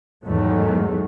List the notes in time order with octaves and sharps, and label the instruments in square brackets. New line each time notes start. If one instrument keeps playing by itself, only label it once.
[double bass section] E2 G#2 D#3 F#3 A3